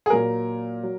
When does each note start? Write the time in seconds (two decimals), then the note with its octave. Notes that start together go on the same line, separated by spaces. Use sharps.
0.06 G#4
0.10 A#2 F#3 A#4
0.83 F#3